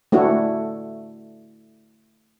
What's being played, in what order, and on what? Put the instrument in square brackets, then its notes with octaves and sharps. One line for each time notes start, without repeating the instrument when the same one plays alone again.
[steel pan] A3 D4 E4 F#4